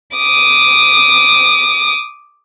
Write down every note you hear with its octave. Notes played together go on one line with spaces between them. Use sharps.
D6 D#6